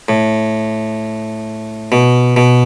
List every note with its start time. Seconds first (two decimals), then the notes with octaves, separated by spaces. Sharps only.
0.09 A2
1.92 B2
2.37 B2